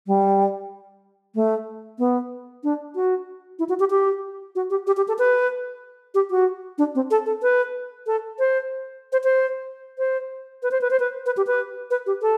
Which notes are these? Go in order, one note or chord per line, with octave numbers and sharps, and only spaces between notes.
G3
A3
B3
D4
F#4
E4
F#4
G4
G4
F#4
G4
G4
G4
A4
B4
G4
F#4
D4
C4
A4
A4
B4
A4
C5
C5
C5
C5
B4
C5
B4
C5
B4
B4
G4
B4
B4
G4
A4